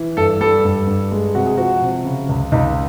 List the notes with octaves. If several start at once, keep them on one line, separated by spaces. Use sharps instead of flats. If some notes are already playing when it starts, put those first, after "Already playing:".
Already playing: E3
G2 A4
G3 A4
G2
G2
G#3
C3 F#4
G#4
F3 F#4
C3
C#3
C#2
C#2 D#4